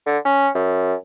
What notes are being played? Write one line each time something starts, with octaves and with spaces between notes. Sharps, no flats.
D3
C#4
F#2